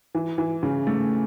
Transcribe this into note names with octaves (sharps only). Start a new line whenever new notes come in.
E3
E3
C#3
A3